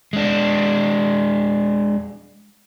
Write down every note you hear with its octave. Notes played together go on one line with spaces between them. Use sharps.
G#3 D4